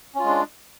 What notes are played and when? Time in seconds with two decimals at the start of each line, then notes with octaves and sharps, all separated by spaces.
0.15 C#4
0.19 F4
0.24 G#3
0.28 D4